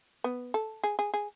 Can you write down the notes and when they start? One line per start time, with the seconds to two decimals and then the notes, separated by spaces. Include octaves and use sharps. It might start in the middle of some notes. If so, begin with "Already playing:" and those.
0.24 B3
0.54 A4
0.83 G#4
0.99 G#4
1.14 G#4